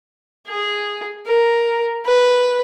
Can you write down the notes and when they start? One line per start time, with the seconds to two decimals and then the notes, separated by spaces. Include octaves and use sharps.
0.48 G#4
1.27 A#4
2.06 B4